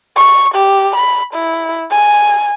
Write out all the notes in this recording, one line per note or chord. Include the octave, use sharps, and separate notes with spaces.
C#6
G4
B5
E4
G#5